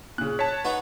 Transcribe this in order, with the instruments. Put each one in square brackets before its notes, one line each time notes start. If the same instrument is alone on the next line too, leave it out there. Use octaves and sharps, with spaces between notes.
[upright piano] A#2 C#3 [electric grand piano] F#6
[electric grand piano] C#5 A5 [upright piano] B6
[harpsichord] B3 D#4 F#4